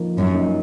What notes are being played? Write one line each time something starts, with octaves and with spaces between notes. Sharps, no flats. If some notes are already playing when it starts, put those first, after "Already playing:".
Already playing: F3 A#3 D#4
F#2
A#3 D#4